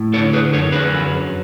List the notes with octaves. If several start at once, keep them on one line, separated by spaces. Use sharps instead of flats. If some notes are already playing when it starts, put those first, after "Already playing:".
Already playing: A2
D3 A4 C#5
G#4 B4
F#2 A4 C#5
G#4 B4
F#3